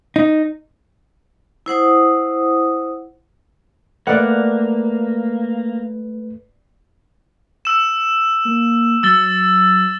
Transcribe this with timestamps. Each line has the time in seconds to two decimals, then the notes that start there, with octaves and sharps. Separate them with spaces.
0.16 D#4
1.66 E4 C5 F#5 D#6
4.07 A3 A#3 B4 D5 F#5
7.65 E6 E7
8.45 A#3
9.03 F#3 E6 A6 G7